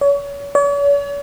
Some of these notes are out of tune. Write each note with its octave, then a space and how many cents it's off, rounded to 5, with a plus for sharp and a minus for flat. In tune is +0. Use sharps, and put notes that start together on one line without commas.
C#5 +35
C#5 +45